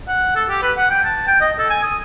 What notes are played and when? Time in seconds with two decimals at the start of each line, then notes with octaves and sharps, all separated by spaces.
0.08 F#5
0.36 A4
0.49 G4
0.63 B4
0.78 F#5
0.90 G5
1.05 A5
1.27 G5
1.41 D#5
1.59 A4
1.70 G#5
1.83 D#6